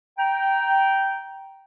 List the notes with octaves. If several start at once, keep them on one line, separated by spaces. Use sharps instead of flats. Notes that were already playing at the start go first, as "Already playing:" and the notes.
G5 A#5